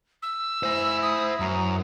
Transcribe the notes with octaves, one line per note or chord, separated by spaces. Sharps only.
E6
E4 C5 G#5
D#6
F#2 A#5